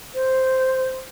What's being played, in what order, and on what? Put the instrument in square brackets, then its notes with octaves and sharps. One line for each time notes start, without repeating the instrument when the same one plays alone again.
[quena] C5